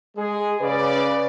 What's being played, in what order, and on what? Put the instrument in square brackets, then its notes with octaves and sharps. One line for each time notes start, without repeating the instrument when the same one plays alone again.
[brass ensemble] G#3 G#4
C#3 B4 D5